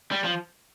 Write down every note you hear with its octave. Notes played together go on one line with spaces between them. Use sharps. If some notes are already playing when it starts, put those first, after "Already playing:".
G3
F3